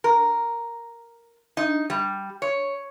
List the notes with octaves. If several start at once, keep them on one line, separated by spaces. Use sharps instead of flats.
A#4
D#4
G3
C#5